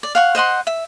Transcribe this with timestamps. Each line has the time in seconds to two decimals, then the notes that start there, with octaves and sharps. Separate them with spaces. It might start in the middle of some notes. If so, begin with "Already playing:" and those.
0.03 D5
0.15 F5 F#5 C#6
0.35 C5 D#5 F#5 C6
0.67 E5